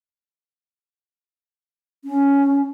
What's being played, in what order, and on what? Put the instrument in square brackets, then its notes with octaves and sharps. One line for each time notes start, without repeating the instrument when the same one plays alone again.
[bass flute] C#4